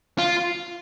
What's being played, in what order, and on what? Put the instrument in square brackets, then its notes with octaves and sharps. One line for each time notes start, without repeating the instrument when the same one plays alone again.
[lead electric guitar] F4